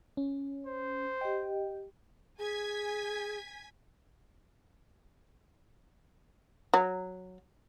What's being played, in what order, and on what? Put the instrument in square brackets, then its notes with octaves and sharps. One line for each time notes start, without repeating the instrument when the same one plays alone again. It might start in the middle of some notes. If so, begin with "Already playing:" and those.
[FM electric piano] C#4
[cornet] C5
[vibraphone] G4 D#5 [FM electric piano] G5
[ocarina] G#4 [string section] G#5 G#6 B6
[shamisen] F#3